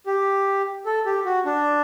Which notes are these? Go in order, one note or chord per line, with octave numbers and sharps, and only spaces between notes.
G4
A4
G4
F#4
D4